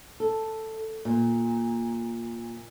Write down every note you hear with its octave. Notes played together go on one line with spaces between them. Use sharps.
A4
A#2